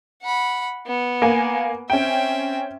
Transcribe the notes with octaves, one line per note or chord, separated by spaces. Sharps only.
F#5 B5
B3
A#3 G#5
C4 C#4 E5 G5